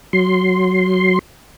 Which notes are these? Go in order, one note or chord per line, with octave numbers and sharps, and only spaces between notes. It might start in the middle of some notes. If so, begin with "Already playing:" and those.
F#3 C6